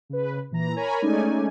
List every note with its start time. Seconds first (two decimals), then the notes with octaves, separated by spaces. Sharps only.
0.09 C#3 B4
0.51 A#2 E3 A#5
0.76 A#4 C#5 G#5 A#5 B5
1.02 G#3 A3 C#4 D#4 D5 G#5